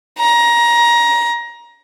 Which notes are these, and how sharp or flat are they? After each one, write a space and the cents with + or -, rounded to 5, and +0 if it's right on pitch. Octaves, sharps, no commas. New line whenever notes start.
A#5 +20